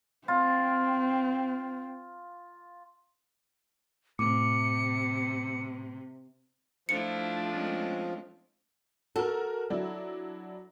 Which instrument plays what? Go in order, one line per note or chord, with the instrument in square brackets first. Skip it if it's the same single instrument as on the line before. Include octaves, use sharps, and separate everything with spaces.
[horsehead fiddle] C4 [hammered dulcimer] F4
[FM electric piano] A2 [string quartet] C3 [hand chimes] D6 [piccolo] C#7
[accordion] F3 [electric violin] A3 D4 [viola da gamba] E4 F4 [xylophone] C#7
[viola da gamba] G#3 C4 C#4
[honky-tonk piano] F#4 A#4 [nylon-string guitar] A4
[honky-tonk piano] F#3 D4 E4